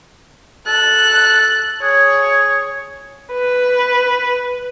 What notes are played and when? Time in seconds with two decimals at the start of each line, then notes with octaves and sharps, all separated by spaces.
0.67 A4 F#6
1.83 G#4 C#5
3.32 B4